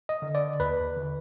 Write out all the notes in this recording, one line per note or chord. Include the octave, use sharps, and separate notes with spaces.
D#5
D3
D5
D#2 B4
D3